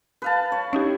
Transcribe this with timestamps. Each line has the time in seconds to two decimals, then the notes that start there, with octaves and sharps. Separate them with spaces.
0.22 B4 F5 A5
0.52 C#5
0.73 C#4 D#4 E4 G4